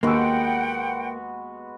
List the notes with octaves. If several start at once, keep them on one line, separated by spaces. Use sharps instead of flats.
D#2 G#3 A#3 B3 F#4 F#5 G5 E6